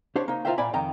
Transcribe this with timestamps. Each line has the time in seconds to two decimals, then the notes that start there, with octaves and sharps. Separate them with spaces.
0.16 D4 G4 C5 C#5
0.28 A#3 D#4
0.45 F4 G4 A#4 C5 E5 G5
0.58 A#2 D5 G#5 B5
0.73 F2 D#3 G5 A#5